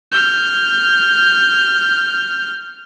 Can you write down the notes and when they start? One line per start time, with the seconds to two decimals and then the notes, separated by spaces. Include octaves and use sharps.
0.12 F6 G6